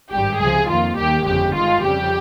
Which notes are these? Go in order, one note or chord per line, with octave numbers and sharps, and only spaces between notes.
G#1 G2 G3 G4
C#2 C3 F3 G#4
F2 D#3 G3 A#3 F4
D#2 D#3 A#3 G4
G1 F2 C#3 G#3 G4
G2 D#3 G#3 F4
F2 C#3 G3 G4